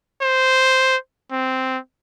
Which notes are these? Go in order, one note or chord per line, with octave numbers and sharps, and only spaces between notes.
C5
C4